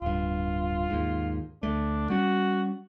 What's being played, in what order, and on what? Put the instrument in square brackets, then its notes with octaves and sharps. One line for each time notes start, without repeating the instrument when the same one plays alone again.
[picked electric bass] D1 G2 [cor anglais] F4
[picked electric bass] D#2 G#2
[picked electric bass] D2 A3 [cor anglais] D4
[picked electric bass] G3 C#4 [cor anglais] F#4